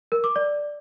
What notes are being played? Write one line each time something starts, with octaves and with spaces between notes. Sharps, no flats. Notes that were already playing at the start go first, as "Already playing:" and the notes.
A#4
D6
D5